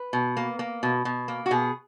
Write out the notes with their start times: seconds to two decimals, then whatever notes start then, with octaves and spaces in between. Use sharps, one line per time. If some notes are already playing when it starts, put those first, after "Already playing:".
Already playing: B4
0.13 B2
0.37 A#3
0.59 A#3
0.83 B2
1.05 B2
1.28 A#3
1.46 F#4
1.51 B2 G#4